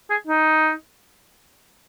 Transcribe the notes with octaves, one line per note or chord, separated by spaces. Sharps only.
G#4
D#4